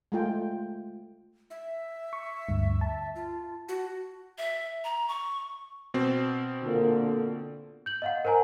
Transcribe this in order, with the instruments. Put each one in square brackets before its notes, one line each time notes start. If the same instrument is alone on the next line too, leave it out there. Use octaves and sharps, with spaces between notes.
[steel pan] G#3 A3 F4 G5
[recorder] E5
[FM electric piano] C#6
D2 G2
A5
[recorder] F4
F#4
[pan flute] E5
A#5
C#6
[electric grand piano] B2 C4 C5
[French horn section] A#2 D3
[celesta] G6 F#7
D#5 F5 F#5
A#4 C5 F#5 G#5 A#5